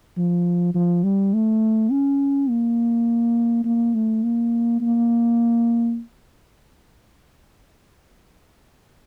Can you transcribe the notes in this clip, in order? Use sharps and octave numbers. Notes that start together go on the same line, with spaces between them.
F3
F3
G3
A3
C#4
A#3
A#3
A3
A#3
A#3